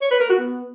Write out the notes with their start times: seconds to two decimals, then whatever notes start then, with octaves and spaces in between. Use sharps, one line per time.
0.01 C#5
0.11 B4
0.20 A#4
0.29 F#4
0.39 B3